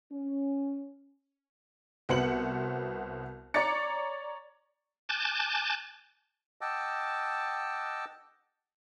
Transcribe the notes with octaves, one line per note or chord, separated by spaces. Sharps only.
C#4
C2 B3 F#4 C5 C#7 F#7
C#5 D5 A#5 D6 A6 C#7
G#5 A5 D6 F#6 G6 A6
D#5 F#5 G5 A5 D6 E6